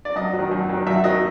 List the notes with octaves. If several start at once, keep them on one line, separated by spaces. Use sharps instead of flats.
D5
F#2 D#5
D#3 F#3
F#2
D#3 F#3
F#2 E5
D#3 F#3 D#5